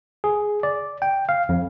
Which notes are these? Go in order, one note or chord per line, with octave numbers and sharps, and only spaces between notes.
G#4
D5
G5
F5
F2